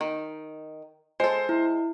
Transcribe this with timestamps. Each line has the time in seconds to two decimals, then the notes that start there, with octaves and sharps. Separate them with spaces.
0.01 D#3
1.20 G#3 A4 C5
1.49 E4